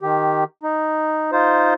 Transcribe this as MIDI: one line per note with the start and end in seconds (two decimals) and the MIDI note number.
0.01 0.44 51
0.01 0.44 67
0.63 1.32 63
1.32 1.74 63
1.32 1.74 65
1.32 1.74 72